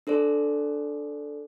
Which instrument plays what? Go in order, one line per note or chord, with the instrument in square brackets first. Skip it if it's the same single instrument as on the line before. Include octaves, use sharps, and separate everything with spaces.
[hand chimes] D4 A4 C5 D5